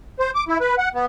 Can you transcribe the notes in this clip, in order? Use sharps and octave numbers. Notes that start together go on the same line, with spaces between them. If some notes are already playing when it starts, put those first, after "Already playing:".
C5
D6
E4
B4
F#5
B3